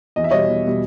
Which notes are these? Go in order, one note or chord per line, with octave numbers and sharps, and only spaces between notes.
E2 D#5
E5
B2 G3 C#5 D#5
E2
B2 G3